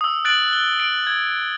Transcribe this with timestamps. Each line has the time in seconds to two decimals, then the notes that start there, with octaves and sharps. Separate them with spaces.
0.01 D#6 E6
0.25 F#6 A6 D7 F#7
0.53 G7
0.80 D7
1.07 G#6